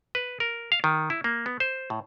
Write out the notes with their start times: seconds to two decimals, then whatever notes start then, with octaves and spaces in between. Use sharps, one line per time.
0.15 B4
0.40 A#4
0.72 F5
0.84 D#3
1.10 E4
1.24 A#3
1.46 B3
1.60 C5
1.90 A2